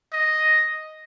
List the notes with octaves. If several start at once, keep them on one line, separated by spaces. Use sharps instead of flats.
D#5